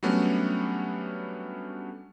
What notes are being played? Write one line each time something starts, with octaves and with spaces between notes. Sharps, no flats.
F#3 G3 A3 B3 C#4 D4